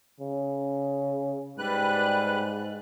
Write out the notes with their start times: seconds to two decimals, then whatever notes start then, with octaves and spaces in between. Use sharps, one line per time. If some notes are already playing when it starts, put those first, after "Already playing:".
0.20 C#3
1.58 G#2 G3 B4 F#6